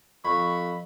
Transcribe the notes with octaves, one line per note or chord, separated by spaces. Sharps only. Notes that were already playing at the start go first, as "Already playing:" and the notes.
F2 B5 C#6